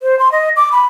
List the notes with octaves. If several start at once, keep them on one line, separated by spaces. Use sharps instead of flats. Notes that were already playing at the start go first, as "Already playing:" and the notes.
C5
C6
D#5
D6
B5